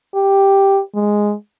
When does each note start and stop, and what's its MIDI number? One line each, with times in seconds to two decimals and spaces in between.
0.15 0.80 67
0.95 1.34 56